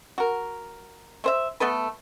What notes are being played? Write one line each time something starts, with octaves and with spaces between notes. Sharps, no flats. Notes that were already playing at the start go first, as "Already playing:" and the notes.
F#4 A#4
A3 C5 E5
A3 B3 A4 B4